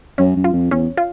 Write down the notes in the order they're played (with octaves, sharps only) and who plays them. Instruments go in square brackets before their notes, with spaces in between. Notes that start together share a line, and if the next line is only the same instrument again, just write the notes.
[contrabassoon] F#2 [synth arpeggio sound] C#4
[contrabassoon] F#2
[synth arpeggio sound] F4
[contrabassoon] F2
[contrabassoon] E2 [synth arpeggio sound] C#4
[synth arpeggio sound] F4